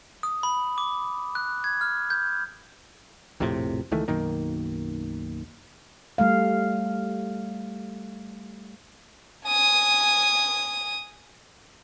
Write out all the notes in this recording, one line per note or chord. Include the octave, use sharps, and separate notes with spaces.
D#6
B5
D6
F#6
G#6
F6
G6
A#1 F2 A2 C3
C#2 D#3 E3 A3
B1 F#2 D#3 A#3
G3 A3 F5
G#5 D#6